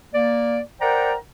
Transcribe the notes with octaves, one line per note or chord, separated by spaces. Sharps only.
A#3 D5
A#4 C5 D5 F#5 G5 A#5